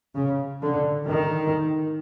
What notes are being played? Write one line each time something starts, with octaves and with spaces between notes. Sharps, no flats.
C#3
D3
D#3